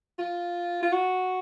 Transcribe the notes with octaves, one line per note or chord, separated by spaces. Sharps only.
F4
F4
F#4